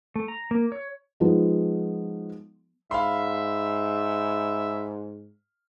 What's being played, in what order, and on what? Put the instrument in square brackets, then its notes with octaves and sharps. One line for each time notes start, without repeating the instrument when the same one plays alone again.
[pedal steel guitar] A3
A#5
A#3
C#5
[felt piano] F3 G#3 B3 D#4
[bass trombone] G#2 [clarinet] E5 [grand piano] F5 B5 C6